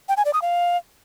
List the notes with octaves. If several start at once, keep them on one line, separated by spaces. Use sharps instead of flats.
G5
G#5
D5
D#6
F5